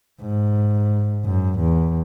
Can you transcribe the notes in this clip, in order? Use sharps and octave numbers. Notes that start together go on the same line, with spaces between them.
G#2
F#2
E2